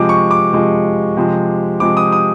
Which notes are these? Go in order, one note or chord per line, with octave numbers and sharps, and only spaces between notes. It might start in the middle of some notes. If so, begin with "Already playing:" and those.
Already playing: C3 F3 G#3 D6
C#6
D6
C3 F3 G#3
C3 F3 G#3
C3 F3 G#3 D6
D#6
D#6